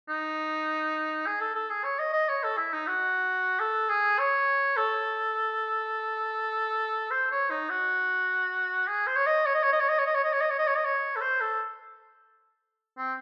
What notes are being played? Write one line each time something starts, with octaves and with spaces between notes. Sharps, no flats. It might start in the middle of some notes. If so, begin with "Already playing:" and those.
D#4
G#4
A4
A4
G#4
C#5
D#5
D#5
C#5
A4
E4
D#4
F#4
A4
G#4
C#5
A4
C5
C#5
D#4
F#4
G#4
C5
C#5
D#5
C#5
D#5
C#5
D#5
C#5
D#5
C#5
D#5
C#5
D#5
C#5
D#5
C#5
D#5
C#5
D#5
C#5
A4
C5
A4
C4